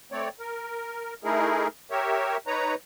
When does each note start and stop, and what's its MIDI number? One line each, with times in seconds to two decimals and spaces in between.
0.12 0.29 57
0.12 0.29 60
0.12 0.29 73
0.12 0.29 74
0.39 1.14 70
1.24 1.67 57
1.24 1.67 63
1.24 1.67 64
1.24 1.67 68
1.24 1.67 70
1.91 2.37 67
1.91 2.37 70
1.91 2.37 73
1.91 2.37 76
2.47 2.75 63
2.47 2.75 71
2.47 2.75 73
2.47 2.75 82